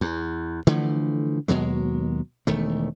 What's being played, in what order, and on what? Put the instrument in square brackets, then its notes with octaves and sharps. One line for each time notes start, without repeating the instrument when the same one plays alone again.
[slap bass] E2
D3 E3 F3 A3
D#2 B2 F#3 G#3
E1 D#3 A3